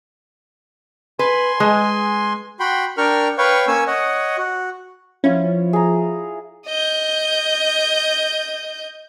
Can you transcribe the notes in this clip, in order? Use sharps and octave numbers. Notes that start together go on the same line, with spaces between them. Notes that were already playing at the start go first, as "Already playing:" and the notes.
B4 G#5 C6
G#3
F#4 G5 B5 C6
D4 A#4 G5 C#6 F6
B4 C#5 F5 G5 C#6
A#3 C#4 C#5 G#5 E6
C#5 D#5 F#5
F#4
F3 C#4 E4 F4 C#5
G#4 A#5
D#5 G6